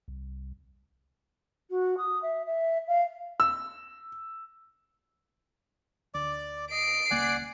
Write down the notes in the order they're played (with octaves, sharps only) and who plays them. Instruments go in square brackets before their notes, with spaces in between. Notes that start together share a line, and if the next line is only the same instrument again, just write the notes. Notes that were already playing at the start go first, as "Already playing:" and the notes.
[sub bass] C2
[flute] F#4
D#6
E5
E5
F5
[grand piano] E6
[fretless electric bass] D2 [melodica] D5 D6
[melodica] D#5 [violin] C7 D7
[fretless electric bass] D#1 C#2 A#3 [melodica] D5 F#5 G#5